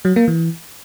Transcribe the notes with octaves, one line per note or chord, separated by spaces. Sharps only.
F#3
A#3
E3